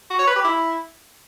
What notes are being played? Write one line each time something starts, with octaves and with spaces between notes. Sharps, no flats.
F#4
C#5
B4
G4
E4